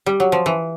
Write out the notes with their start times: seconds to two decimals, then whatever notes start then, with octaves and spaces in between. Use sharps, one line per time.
0.06 G3
0.20 F#3
0.32 F3
0.46 E3